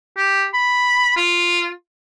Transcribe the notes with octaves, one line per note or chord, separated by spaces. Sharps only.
G4
B5
F4